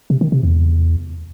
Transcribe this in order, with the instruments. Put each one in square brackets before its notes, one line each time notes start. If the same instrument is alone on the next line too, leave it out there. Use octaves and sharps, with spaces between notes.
[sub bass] C3
D#3
C3
E2